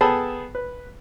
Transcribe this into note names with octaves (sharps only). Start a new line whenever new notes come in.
B3 G#4 A4 G5 A5 B5
B4